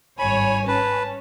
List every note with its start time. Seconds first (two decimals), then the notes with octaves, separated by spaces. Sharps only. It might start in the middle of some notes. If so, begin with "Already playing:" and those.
0.19 G#1 G2 C#5 G#5 B5
0.68 C#4 B4 A5